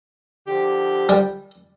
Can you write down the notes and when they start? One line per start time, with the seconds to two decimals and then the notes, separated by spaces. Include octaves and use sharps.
0.47 D3 F3 G4
1.09 G3